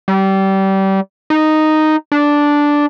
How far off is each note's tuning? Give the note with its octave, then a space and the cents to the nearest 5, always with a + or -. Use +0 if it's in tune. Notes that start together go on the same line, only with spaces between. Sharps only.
G3 -25
D#4 -5
D4 -5